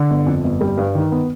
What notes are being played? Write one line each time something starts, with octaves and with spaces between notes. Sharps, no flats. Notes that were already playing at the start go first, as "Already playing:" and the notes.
Already playing: D3
G1
F2
G1
G3
G2
D#3
B3